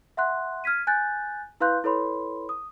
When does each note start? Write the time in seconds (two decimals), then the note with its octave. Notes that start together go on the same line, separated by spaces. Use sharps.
0.17 E5 F#5 C6 F#6
0.64 F6 G#6 B6 D#7
0.87 G#5 F#6 G6 A6
1.60 E4 B4 F5 C6 F#6 G6
1.84 E4 A4 B4 C#5 B5 C6
2.49 D#6